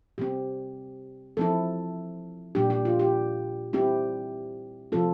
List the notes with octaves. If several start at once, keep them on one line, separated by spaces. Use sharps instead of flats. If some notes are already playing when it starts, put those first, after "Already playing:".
C3 G3 C4 G4
F3 C4 E4 A4
A#2 G3 D4 G4
G4
F4
G4
G3 C4 E4 G4
C3 F3 C4 F4 A4